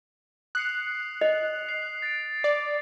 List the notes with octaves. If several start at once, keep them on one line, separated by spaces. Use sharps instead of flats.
D#6 F#6 C7 C#7
D#5 F7
C7
A6 D7
D5